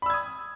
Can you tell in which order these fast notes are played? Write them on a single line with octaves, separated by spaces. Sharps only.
B5 E6 G#6 D#6